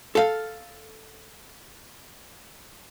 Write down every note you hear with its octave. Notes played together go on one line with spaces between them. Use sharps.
A4 F5